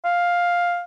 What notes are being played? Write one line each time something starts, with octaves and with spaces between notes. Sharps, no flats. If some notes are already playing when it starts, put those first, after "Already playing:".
F5